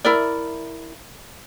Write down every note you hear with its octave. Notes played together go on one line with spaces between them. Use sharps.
E4 A#4 D5